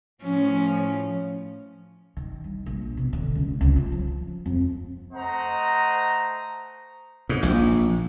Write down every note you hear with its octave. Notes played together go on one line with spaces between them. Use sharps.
A2 F3 C#4
D#3
G2
A#1
B2
D3
C#2
C#2
F4
F3
F2
A3 C5 D#5 F#5 A#5
G#2
A#1